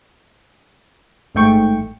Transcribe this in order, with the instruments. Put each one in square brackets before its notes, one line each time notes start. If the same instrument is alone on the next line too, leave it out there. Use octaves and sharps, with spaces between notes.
[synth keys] A1 G#2 A3 G5 C#6